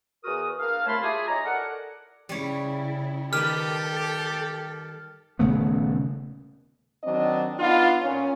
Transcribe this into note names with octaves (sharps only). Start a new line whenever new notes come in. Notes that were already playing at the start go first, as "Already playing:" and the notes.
E2 F#4 A#4 D#6
A#3 D4 A#4 F5
C2 A3 C#5 A5 B5 C6
E4 F4 G4 G#4
D#4 C#5 G#5 A#5
A4 A#4 D5 F#5
C#3 G3 E4 C#5
D#3 G4 A4 B4 F6
D#1 C#3 A3 B3
D#3 F#3 C4 D4 D#5
B3 D4 D#4 F4
A#2 C#4